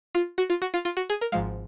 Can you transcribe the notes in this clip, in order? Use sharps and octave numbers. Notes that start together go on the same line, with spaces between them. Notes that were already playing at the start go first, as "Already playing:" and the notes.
F4
F#4
F4
F#4
F4
F4
F#4
G#4
A#4
G#1 G#2 F3 G#3 F5